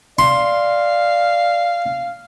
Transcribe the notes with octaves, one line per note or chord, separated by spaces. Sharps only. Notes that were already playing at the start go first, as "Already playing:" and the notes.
D5 F5 C6